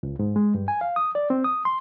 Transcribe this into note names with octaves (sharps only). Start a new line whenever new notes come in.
C#2
G#2
G#3
G2
G#5
F5
D#6
D5
C4
D#6
C6